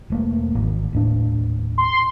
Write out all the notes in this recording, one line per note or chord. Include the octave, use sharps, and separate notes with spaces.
E1 A3 A#3
G#1
D#1 A2 D4
C6